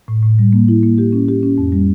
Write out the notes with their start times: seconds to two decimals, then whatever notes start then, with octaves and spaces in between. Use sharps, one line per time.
0.08 A2
0.23 A2
0.39 G3
0.53 A#3
0.68 E4
0.83 A#3
0.98 G4
1.13 C#4
1.29 G4
1.43 C#4
1.58 F2
1.72 G3